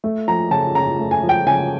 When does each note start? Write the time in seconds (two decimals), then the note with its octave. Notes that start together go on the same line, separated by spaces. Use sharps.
0.04 A3
0.27 F3 A#5
0.51 C#3 A5
0.75 C#3 A#5
0.99 A3
1.11 G#5
1.23 F3
1.29 G5
1.46 C#3 G#5